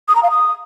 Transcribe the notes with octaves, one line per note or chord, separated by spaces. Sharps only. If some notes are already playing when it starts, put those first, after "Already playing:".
D#6
A#5
F5
D#6